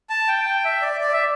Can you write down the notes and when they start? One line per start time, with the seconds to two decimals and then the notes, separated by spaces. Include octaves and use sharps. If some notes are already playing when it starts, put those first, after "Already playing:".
0.10 A5
0.28 G5
0.45 G5
0.65 E5
0.82 D5
1.01 D5
1.13 E5